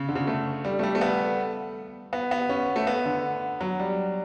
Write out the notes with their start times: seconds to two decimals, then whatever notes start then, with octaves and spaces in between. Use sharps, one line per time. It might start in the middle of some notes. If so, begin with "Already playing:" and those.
Already playing: C#3
0.09 D3
0.15 C#3
0.27 A3
0.65 G3
0.79 A3
0.83 G3
0.95 A3
1.01 B3
2.13 B3
2.31 B3
2.49 C#4
2.76 A3
2.87 B3
3.05 D3
3.61 F#3
3.80 G3